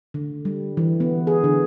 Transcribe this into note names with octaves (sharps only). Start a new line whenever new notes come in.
D3
G3
E3
B3
G#4
D3